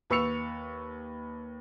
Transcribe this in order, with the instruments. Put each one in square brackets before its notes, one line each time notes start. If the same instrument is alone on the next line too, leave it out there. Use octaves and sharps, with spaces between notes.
[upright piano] D#2 B4 C#6 E6 C#7 F7